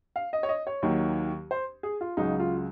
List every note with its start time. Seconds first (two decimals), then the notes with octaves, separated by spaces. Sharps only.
0.16 F5
0.33 D#5
0.43 C#5
0.49 D#5
0.67 C#5
0.82 D#2 D#3 F#3
1.51 C5
1.83 G#4
2.01 F4
2.17 C#2 C#3 F#3 D#4
2.39 F4